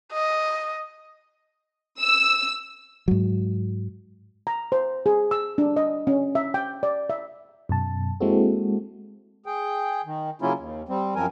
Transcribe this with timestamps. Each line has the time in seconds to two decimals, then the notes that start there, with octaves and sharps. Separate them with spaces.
0.12 D#5
2.00 E6
3.08 G#2 F#3
4.47 A#5
4.72 C5
5.06 G#4
5.31 E6
5.58 D4
5.77 D#5
6.07 C#4
6.35 E5
6.54 G5
6.83 D5
7.10 E5
7.69 F#2 B2 A5
8.20 G#3 A#3 C4 E4 F#4 A4
9.46 G#4 G5
10.06 D#3
10.42 C#3 F#3 A#3 C#4 E4 F4
10.59 D#2
10.89 G3 C4
11.16 F#2 F3 C4 A#4 G#5